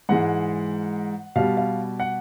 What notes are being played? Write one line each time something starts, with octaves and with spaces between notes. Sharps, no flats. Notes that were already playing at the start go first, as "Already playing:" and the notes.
G#2 E3 G#3 F#5
B2 G3 F5
F5
F#5